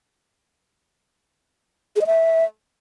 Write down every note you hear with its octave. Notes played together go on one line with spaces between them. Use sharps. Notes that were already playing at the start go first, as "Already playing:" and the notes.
G#4
D#5
E5